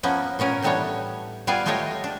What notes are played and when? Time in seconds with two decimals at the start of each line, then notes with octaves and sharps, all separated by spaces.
0.03 F3 A#3 B3 C#4
0.39 A#2 B3 C#4 A#4
0.62 A2 E3 G3 B3 D4 C#5
1.47 G3 B3 F4 D5 F5 G#5
1.66 G#3 A3 F4 G4 C#5 D#5
2.04 D4